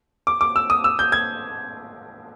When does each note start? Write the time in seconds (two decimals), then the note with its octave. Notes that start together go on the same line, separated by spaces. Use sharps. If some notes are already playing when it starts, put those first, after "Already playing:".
0.27 D6
0.41 D6
0.56 E6
0.70 D#6
0.84 E6
0.99 G6
1.12 G#6